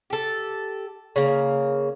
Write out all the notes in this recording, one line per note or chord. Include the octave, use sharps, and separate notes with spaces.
G4 A4
C#3 A#3